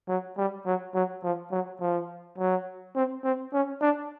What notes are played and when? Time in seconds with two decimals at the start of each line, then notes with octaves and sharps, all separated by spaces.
0.09 F#3
0.38 G3
0.66 F#3
0.94 F#3
1.23 F3
1.51 F#3
1.80 F3
2.38 F#3
2.95 C4
3.24 C4
3.53 C#4
3.81 D4